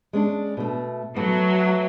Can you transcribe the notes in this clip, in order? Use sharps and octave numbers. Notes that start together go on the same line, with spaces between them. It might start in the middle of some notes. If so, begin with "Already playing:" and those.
G#3 C#4 D4
B2 A3
F#3 A3 B3